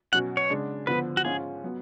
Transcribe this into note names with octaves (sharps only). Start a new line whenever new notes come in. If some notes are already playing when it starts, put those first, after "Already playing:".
B2 F#3 C#4 F#4 F#5
C#5
C#3 G#3 D4
D3 F3 B3 B4
F#4
G#2 G#3 C#4 F4 G#4
F#3 B3